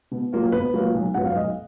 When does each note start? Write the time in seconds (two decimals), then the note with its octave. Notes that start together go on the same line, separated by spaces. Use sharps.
0.11 B2
0.33 F#3 A#3 F4
0.52 B2 B4
0.74 F#3 A#3 F4
0.94 B1
1.14 B2 F#3 B3 F#5
1.25 F5
1.35 B1 D#5